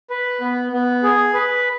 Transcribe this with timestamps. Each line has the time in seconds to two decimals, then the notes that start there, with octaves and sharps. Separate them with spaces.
0.10 B4
0.41 B3
0.72 B3
1.03 G#4
1.34 B4